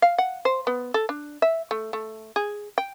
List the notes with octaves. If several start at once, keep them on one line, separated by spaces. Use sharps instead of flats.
F5
F#5
C5
B3
A4
D4
E5
A3
A3
G#4
G5